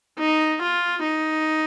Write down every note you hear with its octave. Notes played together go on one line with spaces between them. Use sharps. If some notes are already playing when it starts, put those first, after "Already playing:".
D#4
F4
D#4